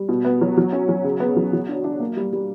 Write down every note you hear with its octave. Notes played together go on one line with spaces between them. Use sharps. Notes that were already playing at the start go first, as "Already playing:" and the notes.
Already playing: G3
B2
B3
F#3
F#3
C#4
F#3
C#3
B3
F#3
F#3
D4
D4
A#3
G3
G3